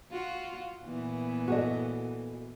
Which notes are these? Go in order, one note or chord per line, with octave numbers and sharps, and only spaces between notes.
F4 F#4
A#2 E3 B3
F#4 A4 D#5